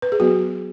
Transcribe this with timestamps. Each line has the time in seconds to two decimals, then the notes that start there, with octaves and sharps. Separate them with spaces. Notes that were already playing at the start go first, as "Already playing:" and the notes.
0.02 B4
0.12 G#4
0.20 F#3 B3 F#4